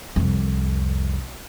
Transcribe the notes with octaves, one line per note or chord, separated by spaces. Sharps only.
C2 F2